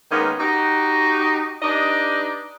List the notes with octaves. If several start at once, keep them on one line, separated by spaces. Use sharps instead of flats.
D#3 G#3 A#3 B3 C#4 D#4
D#4 F#4 G4
D4 D#4 G4 B4 D5 D#5